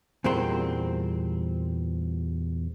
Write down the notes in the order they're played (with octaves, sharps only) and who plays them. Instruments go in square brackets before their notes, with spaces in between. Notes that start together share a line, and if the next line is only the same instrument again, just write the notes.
[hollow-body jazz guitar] E2 A#2 G3 A#3 C4 C6